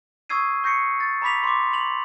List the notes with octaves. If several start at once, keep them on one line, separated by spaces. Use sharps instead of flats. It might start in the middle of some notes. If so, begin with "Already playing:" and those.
C#6 D#6 E6 G#6 C7 D#7
C#6 G6 A#6 C7 C#7
A6
A#5 B5 D6 B6 F7
C6 D6
F7 F#7